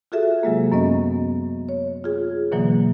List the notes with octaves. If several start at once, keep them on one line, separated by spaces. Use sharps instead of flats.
F4 F#4 G#4 A4 E5
C3 F#3 G#3 A#3
F#2 B3 C#4 D#5
C#5
F4 G#4
B2 D3 E3 F#3 A#3